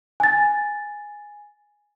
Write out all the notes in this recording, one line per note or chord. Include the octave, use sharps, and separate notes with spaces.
G#5 A6